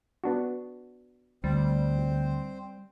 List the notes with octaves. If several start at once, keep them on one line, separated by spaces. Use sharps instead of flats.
B3 D4 F#4
D2 G3 C4 C5